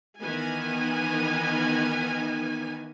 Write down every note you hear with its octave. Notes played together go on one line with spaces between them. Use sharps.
D#3 E3 B3 G#5